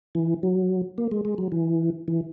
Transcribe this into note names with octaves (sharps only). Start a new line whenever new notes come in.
E3
F#3
A#3
G#3
G#3
F#3
E3
E3